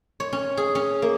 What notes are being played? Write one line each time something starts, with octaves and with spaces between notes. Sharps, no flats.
C#5
C#4
G#4
C#4
A#3